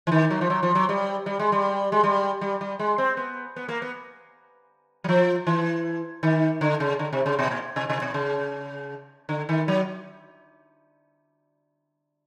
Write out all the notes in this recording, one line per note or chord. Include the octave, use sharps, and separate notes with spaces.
E3
D#3
F#3
F3
F#3
F3
F#3
G3
G3
G#3
G3
G#3
G3
G3
G3
G#3
C4
B3
B3
A#3
B3
F#3
F3
E3
D#3
D3
C#3
D3
C3
C#3
B2
A#2
C3
C3
B2
C#3
D3
D#3
F#3